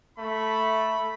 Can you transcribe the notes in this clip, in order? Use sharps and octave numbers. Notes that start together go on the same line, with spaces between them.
A3 B5